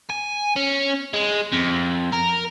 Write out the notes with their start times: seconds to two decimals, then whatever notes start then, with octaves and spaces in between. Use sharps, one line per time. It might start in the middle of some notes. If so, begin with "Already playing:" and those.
0.10 G#5
0.56 C#4
1.13 G#3
1.52 F2
2.13 A#4